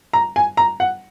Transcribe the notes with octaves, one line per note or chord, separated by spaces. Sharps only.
A#5
G#5
A#5
F#5